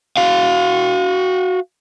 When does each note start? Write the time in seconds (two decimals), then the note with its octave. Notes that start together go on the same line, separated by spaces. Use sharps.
0.17 F#4 F5